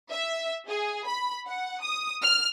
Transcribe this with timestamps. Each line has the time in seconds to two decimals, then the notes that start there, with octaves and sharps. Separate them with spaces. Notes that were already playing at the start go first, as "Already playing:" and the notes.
0.10 E5
0.68 G#4
1.07 B5
1.47 F#5
1.82 D#6
2.22 F6